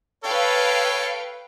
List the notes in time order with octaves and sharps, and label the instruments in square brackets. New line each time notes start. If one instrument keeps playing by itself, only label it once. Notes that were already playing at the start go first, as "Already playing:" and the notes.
[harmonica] A4 C#5 [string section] B4 F5 G5